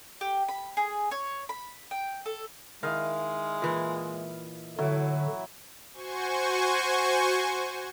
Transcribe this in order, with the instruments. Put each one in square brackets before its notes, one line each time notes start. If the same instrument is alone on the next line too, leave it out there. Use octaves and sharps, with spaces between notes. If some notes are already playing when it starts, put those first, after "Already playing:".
[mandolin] G4
B5
G#4
C#5
B5
G5
A4
[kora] D#3 [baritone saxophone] G#3 [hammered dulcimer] E4 D#5 F5
[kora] A#2 E3
[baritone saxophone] A2 [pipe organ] D3 [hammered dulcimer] F#3 E4 F#4
[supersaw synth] F#4 C5 G#5 C#6